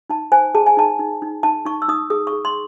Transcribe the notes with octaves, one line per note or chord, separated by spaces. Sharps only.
D#4 A5
C5 G#5
G#4 A5
G#5
D#4 A5
D#4
D#4
D#4 A5
D#4 C#6
E6
D#4 D#6
G#4 D#6
C#6
G#4
C6